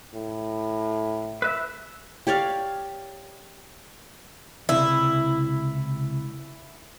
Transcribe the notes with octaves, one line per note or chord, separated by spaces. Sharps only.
A2
B4 E5
G4 C#5 D5 F5
C#2 C3 E4